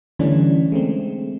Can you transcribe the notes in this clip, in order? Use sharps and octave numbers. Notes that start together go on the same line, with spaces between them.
D3 E3 G3 A3 C#4 D4
G#3 A3 C4